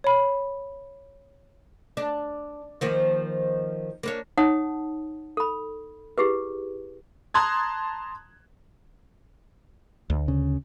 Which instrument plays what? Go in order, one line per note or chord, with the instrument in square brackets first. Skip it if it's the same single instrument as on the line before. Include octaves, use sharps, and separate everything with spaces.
[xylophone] C#5 B5
[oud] D4
D#3 F3 A#3
A#3 D4 C#5
[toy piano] D#4 C#5 F#5 A5 D#6
A4 B5
E4 G4 G#4 B4
[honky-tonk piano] A5 A#5 C6 D#6 F#6 G#6
[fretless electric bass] D2
[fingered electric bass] C#3